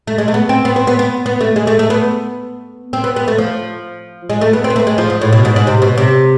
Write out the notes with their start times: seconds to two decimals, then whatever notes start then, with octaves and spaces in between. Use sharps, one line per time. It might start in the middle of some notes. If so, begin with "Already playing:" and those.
0.07 A3
0.18 G#3
0.28 A3
0.34 B3
0.49 C4
0.65 B3
0.76 C4
0.87 B3
0.99 B3
1.26 B3
1.41 A3
1.56 G#3
1.67 A3
1.79 A3
1.90 B3
2.93 C4
3.04 B3
3.16 B3
3.28 A3
3.38 F3
4.30 G#3
4.41 A3
4.53 B3
4.64 C4
4.70 B3
4.76 A3
4.87 G#3
4.98 F3
5.10 G#2
5.21 A2
5.33 B2
5.45 G#2
5.56 G#2
5.67 C3
5.82 B2
5.98 C3